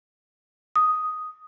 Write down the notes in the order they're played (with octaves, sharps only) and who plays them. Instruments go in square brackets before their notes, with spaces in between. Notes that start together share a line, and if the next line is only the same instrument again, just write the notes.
[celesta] D#6